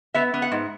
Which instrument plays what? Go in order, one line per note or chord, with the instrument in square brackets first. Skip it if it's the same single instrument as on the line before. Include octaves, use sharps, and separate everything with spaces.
[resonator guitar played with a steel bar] B3 E5
B3
F#5
G#2